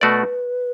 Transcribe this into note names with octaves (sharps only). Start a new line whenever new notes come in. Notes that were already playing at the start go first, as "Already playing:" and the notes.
B2 A3 F#4 B4 D5